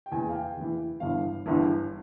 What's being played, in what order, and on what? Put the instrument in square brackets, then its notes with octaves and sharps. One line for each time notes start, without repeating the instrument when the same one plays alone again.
[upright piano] G5
E2 E3 G#5
F5
G5
E2 E3
G1 G2 E3 F5
G1 G2 E3